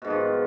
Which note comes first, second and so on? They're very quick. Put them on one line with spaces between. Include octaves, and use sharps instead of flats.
B2 G#2 F3 D#3